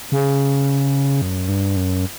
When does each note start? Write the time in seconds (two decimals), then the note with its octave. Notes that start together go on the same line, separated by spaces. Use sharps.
0.12 C#3
1.22 F#2
1.49 G2
1.77 F#2